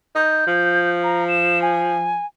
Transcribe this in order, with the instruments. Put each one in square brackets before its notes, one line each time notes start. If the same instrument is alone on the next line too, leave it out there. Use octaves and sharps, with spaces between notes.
[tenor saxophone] D#4 [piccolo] G6
[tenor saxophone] F3
[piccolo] A#5
E7
G#5